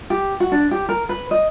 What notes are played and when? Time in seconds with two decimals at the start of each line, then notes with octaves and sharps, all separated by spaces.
0.10 G4
0.40 F#4
0.52 D4
0.71 G4
0.89 A#4
1.09 B4
1.31 D#5